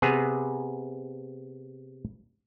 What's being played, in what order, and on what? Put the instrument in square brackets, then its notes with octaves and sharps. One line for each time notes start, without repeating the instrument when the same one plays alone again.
[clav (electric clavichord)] C3 B3 G#4